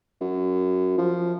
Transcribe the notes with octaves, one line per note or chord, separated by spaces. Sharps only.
F#2
F3